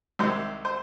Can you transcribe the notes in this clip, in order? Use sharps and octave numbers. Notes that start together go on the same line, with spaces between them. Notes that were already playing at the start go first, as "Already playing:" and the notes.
C2 C3 D#3 G#3 C5
C5